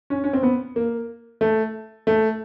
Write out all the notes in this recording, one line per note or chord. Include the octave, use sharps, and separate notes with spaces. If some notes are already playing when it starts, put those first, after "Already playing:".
C#4
C#4
C4
B3
A#3
A3
A3